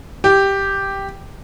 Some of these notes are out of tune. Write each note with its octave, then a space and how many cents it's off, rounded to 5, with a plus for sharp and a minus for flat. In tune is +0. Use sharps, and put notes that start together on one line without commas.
G4 +0